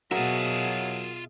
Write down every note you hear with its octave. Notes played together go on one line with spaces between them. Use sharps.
B2 F#3 F4 F#4 G#4 A#4 E5